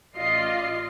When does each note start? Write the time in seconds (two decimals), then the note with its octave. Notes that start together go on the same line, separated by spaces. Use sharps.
0.15 A1 F4 D5 D#5 C7